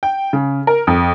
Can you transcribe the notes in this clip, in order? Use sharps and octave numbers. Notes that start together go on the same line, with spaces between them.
G5
C#3
A#4
F2